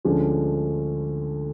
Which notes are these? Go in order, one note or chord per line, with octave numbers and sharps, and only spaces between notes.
D2 D3 F3 G#3 C#4